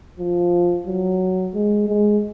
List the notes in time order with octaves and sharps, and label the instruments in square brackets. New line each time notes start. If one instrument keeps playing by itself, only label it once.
[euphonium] F3
F#3
G#3
G#3